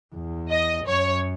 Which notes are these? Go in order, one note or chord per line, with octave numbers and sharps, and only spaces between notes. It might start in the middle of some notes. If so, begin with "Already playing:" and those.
E2
D#5
F#2 C#5